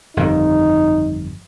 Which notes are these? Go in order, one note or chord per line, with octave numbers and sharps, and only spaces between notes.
G1 F2 D#3 D#4